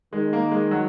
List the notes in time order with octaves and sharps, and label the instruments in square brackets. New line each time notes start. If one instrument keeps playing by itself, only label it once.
[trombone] D#3 [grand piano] G#3
[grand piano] A#3
G#3
F#3